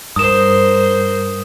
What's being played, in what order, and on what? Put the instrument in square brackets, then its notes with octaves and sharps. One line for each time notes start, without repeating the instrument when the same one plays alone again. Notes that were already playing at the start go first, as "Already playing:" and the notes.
[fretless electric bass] G2 [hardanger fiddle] A#4 C5 [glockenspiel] D#6 E7